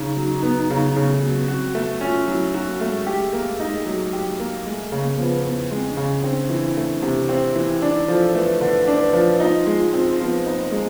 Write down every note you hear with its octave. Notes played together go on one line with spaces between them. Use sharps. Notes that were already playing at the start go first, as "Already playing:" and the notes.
Already playing: C#3 D#4
F#3
B3
C#3
C#3
A3
F#3 A#3
B3
C4 F#4
A3 B3
C#4 F4
F#3 E4
D#4
F#4
A#3
A3
G#3
G#3 G4
A#3
D#4
F#3
G4
A#3
G#3 A3
C#3 A#3
A#3
F3 B3
E2 B3
G#3 C4
D4
C#3 C#4
C4 D4
E3
A3
C3
C4
E3
D4 D#4
F3 A4
A3 B4
D3 B4
D4
C5
B4
F3
D#4 F4
G#3
C4
F3 B3
D#4
A#3
G#3